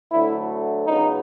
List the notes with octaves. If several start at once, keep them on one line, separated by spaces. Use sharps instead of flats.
D2 D3 F#3 A3 E4
C#2 C#3 F#3 B3 D#4